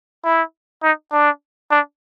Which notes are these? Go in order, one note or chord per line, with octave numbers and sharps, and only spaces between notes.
E4
D#4
D4
D4